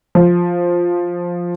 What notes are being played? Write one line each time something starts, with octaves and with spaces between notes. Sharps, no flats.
F3